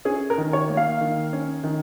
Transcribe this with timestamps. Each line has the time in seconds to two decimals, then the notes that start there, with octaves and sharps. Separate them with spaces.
0.05 C#4 G#4
0.30 A#4
0.38 D#3
0.53 C#5
0.69 A#3
0.77 F5
1.01 D#3
1.33 C#4
1.64 D#3